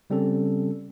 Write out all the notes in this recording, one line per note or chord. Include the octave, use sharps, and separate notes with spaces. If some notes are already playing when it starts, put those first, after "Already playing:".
C#3 G3 C4 C#4 A4